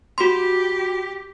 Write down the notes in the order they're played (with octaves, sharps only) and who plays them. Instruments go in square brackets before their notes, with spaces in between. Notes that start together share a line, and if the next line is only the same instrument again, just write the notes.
[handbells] F#4 C6 [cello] G4